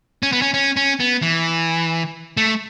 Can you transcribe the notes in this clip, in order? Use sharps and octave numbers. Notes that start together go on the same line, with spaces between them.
C#4
B3
C#4
C#4
C#4
B3
E3
A3